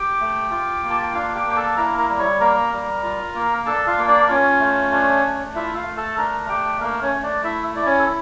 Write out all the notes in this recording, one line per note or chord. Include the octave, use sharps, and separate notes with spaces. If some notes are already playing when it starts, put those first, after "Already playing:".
Already playing: G4 G5
A3
F4
A#3
A5
G5
D4 F4 F5
G4 G5
A#3 G5
A4 A5
E4 A#4 A#5
A#4 A#5
G3 A#5
C#5 C#6
A#3 A#4 A#5
G3
F4
A#3
D4 A4 A5
F4 F5
A#3
D4 D5
A#4
C#4 F4 C#5
A3
D4
A3
E4 F4 E5
F4 F5
A3
A4 A5
D4 A#4 A#5
A3 G4 G5
A3 A#3 A#4
C#4 C#5
A3
D4 D5
E4 E5
E4 D5
C#4 C#5
A4